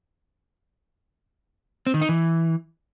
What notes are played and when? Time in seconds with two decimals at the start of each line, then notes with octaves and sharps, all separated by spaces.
1.87 C4
1.94 D#3
2.01 D#4
2.09 E3